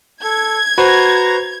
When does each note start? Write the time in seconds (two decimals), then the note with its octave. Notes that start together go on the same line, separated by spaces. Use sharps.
0.24 A4 G#6
0.78 F#4 B4 C5 A#5